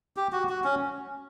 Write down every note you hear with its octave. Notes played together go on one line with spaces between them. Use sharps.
G4
F#4
F#4
C#4